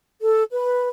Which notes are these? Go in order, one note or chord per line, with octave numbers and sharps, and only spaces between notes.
A4
B4